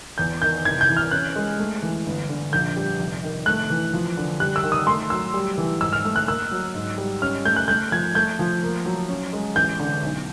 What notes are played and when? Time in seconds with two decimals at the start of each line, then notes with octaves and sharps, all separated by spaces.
0.18 E2 G6
0.42 D#3 G6
0.65 C2 G#6
0.81 G6
0.89 E3
0.97 F6
1.11 C#4 F#6
1.36 G#3
1.59 A3
1.82 E3
2.06 G1
2.29 D3
2.53 A#1 G6
2.76 G3
2.99 F1
3.24 D#3
3.46 A3 F#6
3.70 E3
3.93 F3
4.17 D3
4.40 G3 F#6
4.56 E6
4.63 D#3
4.72 D#6
4.87 A3 C6
5.10 F#3 E6
5.34 G3
5.58 E3
5.81 G#2 E6
5.93 F6
6.05 A3
6.16 F#6
6.27 A#3 E6
6.51 F#3
6.75 G#2
6.98 G3
7.22 C#4 F6
7.45 A3 G6
7.56 F#6
7.68 A3 G6
7.92 F3 G#6
8.15 A3 G6
8.39 F3
8.63 A#3
8.86 F#3
9.09 C#4
9.33 G#3
9.56 A1 G6
9.79 D3
10.03 B1